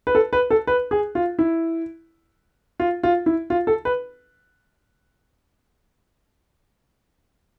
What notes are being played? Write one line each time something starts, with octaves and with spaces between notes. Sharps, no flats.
B4
A4
B4
A4
B4
G#4
F4
E4
F4
F4
E4
F4
A4
B4